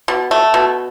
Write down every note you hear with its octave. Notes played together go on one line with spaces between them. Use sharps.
B2
A3
B2